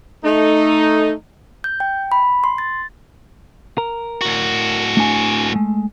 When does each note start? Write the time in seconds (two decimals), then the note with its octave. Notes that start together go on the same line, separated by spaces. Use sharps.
0.24 A3 D#4
1.64 G6
1.80 G5
2.12 B5
2.44 C6
2.58 A6
3.78 A#4
4.21 A2 F#4
4.97 A3 D4 G#5
5.52 G#3 A3